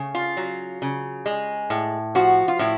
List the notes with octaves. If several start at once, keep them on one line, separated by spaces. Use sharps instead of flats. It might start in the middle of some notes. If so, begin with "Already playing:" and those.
Already playing: C#3 A3
F4
F#3
C#3
G#3
A2
F3 F#4
F4
A2 E4